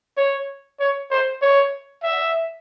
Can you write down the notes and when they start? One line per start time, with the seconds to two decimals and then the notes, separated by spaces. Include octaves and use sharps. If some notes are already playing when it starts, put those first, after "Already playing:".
0.17 C#5
0.80 C#5
1.11 C5
1.42 C#5
2.04 E5